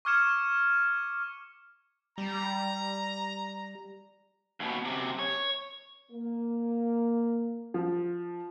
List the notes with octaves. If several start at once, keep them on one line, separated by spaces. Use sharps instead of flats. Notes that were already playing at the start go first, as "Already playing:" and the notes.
C#6 D6 F6 G#6 C#7 E7
G3 A#5
D#2 B2
F#2 C3
C#5
A#3
F3